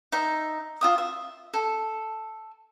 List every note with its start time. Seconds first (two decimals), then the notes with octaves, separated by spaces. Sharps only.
0.12 D#4 E5
0.81 F4 E5 D#6
0.98 E5
1.54 A4